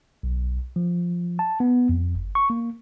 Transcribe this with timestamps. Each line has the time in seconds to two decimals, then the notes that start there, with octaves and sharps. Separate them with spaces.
0.23 B1
0.76 F3
1.39 A5
1.60 B3
1.89 F2
2.15 G1
2.35 C#6
2.50 A#3